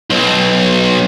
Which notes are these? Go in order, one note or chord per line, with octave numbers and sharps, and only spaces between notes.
B1